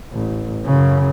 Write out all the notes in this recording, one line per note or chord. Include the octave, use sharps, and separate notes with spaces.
A1
F#2 C#3